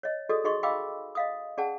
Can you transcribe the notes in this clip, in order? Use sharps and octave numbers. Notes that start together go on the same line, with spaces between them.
C#5 D#5
F#4 G#4 A4 D5 D#5 D#6
D#4 F#4 G#4 D#5 C6 C#6
D#5 F5 G5 B5 D6 E6
D#5 F5 D#6
C#4 G#4 D5 F#5 G5 A5